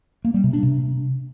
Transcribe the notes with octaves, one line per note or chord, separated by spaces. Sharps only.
A#3
G3
C3
D4
C3